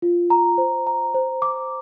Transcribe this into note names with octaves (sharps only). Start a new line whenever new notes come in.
F4
A#5
C5
A#5
C5
D6